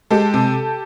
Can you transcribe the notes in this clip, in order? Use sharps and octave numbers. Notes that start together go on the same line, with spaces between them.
G#3 G4 A4
C3